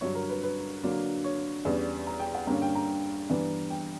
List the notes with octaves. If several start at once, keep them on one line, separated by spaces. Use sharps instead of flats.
G2 D3 F#3 C#5
A#4
B4
B4
D3 F#3 A#3 D4
C#5
E2 C#3 G3 B3 D4
A#5
G5
F#5
G2 D3 A#3 C#4 A#5
G5
A#5
G2 E3 B3 D4
G5